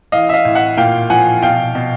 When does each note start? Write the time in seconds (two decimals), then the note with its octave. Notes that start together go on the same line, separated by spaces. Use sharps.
0.12 E3 D#5 F5
0.29 E5
0.34 D#5 F5
0.45 A2
0.55 E5 F#5
0.77 A#2 F5 G5
1.10 F3 F#5 G#5
1.42 B2 F5 G5
1.75 B2